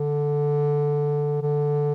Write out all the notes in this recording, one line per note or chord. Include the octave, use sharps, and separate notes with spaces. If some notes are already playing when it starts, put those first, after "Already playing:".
Already playing: D3
D3